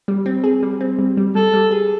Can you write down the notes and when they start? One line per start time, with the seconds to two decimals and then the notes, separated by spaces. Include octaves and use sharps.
0.08 G3
0.26 C4
0.44 G#4
0.63 G3
0.81 C4
0.99 G3
1.17 G3
1.35 G3 A4
1.53 G3
1.71 G#4